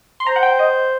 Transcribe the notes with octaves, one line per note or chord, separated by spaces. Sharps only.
C6
C5 A#5
F#5
G5
D#5